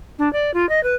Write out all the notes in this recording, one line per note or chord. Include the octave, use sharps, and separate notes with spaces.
D4
D5
F4
D#5
B4